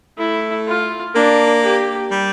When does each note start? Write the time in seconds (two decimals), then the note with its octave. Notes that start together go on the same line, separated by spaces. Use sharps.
0.18 A3 E4
0.67 F4
1.15 A#3 D4
1.63 G4
2.11 G3